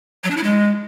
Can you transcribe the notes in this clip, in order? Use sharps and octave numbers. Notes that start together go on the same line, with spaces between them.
F#3
D4
E4
G#3